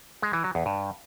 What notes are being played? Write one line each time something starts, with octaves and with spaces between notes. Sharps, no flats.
G#3
E3
F#3
E2
G2